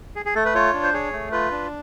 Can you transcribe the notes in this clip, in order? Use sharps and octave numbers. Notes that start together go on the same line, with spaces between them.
G#4
G#4
A3 A4
B4
F4 C#5
D4
C5
G#4 C#5
A3
F4 B4
D4